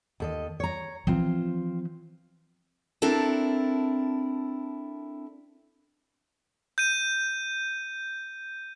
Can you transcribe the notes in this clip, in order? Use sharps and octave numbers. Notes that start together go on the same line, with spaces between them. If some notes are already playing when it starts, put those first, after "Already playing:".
D#2 A4 D#5
C#5 A#5
E3 F3 C4 F4
C4 D4 E4 A4 A#4
G6 D#7